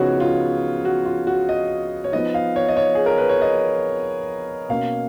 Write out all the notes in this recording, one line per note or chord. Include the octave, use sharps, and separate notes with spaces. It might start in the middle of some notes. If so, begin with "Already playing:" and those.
Already playing: C#3 F3 B3 D#4 F#4 C#5
F4
F#4
F4
F#4
D#5
C#5
F3 B3 D#4 D#5
F5
C#5
D#5
C#5
G#4
A#4
B4
C#5
D#5
B2 A#3 C#4 F5